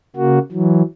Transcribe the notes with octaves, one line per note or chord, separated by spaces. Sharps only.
C#3 A#3 F#4
E3 F#3